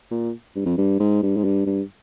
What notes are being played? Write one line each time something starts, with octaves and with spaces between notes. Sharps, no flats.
A#2
G2
F2
G2
G#2
G2
G#2
G2
G2